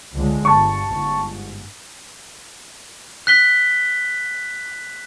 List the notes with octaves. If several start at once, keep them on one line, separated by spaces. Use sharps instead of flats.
C#2 D3 G#3
G1 A5 C#6
G1 G#2
F#6 B6 G7